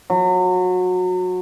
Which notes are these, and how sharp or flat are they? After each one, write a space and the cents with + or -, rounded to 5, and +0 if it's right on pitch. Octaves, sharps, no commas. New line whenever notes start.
F#3 -25